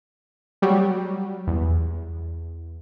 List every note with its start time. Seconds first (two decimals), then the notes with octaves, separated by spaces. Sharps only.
0.62 F#3 G3
1.47 E2